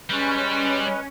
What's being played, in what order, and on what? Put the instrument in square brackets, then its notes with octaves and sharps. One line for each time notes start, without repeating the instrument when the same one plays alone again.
[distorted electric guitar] G3 [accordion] G#3 B4 [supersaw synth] C#4